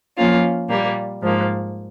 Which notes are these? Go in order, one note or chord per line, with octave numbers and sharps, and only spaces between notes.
F3 A#3 C#4 F4
A#2 G3 A#3
G#2 F3 A#3